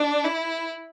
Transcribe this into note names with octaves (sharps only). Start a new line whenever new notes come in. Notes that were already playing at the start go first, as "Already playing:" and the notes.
Already playing: D4
E4